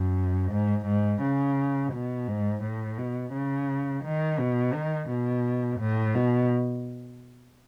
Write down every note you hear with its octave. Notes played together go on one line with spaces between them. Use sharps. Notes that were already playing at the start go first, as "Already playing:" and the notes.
Already playing: F#2
G#2
G#2
C#3
B2
G#2
A2
B2
C#3
D#3
B2
D#3
B2
A2
B2